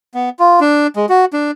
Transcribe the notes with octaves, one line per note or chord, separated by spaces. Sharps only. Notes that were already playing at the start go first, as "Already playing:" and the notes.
B3
F4
D4
G#3
F#4
D4